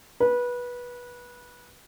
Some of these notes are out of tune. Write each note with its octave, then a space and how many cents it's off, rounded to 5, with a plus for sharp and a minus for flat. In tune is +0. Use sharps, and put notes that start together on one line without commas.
B4 -20